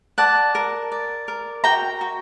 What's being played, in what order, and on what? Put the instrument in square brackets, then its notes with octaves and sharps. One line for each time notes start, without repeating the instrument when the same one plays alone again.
[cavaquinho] D5 F#5 A5
A#4
D5
A#4
F#4 G5 A#5
F#4